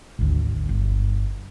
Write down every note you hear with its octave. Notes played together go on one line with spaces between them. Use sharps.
G#1 D2
G1